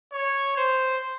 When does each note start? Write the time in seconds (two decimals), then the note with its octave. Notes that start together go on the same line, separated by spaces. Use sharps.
0.13 C#5
0.57 C5